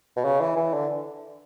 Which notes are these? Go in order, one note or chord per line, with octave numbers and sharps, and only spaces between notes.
B2
C#3
E3
E3
D3